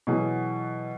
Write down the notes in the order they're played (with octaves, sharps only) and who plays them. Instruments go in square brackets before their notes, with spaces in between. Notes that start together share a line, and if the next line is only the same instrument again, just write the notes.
[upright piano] B2 E3 F#3 G#4